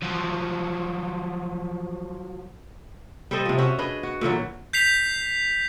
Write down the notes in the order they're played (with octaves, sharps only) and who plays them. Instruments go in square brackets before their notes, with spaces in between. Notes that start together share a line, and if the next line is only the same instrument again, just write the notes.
[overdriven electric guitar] F3 F#3
[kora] G3 A4 C5 D#5
C3 F3
C#4 F#4 E5
D4 G#4 B4 D#5
F#4
A#2 D3 E3 F#3
[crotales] G6 B6 C7 F7